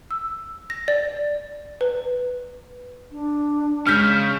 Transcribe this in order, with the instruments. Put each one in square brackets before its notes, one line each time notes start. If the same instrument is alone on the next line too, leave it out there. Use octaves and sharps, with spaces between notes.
[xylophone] E6
A#6
D5
B4
[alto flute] D4
[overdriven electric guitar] C#3 [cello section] G#3 [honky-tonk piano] F6 G6 B6